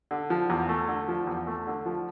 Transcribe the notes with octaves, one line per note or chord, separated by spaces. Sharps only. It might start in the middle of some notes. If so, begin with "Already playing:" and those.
D3
F3
E2
A3
D3
F3
E2
A3
D3
F3